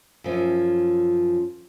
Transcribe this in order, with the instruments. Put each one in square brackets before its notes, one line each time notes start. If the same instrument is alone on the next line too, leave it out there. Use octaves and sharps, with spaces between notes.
[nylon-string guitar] F#2 F3 C#4